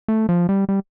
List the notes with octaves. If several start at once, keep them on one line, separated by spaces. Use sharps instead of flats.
A3
F3
G3
G3